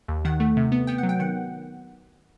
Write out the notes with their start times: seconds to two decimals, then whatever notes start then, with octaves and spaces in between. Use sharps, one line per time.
0.08 D#2
0.25 D#3 F#5
0.40 A3
0.57 C3
0.72 B3
0.87 B3 G5
0.98 F#5
1.03 F#3
1.09 G5
1.19 D#3 F#5